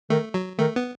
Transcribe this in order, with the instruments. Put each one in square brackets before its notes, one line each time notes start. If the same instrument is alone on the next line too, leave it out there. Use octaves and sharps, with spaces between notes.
[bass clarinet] D#3 [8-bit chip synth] A3
[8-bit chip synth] F#3
[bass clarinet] D#3 [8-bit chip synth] A3
[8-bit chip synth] B3